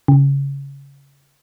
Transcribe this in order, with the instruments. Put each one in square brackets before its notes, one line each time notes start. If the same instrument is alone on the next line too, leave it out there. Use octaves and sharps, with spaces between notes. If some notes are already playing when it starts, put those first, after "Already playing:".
[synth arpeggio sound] C#3